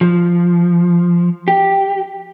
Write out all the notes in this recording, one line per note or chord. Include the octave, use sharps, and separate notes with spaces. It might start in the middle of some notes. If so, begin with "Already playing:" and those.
F3
G4